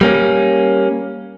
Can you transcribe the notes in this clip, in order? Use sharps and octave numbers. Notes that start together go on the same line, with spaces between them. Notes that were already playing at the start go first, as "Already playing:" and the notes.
G3 A#3 C#4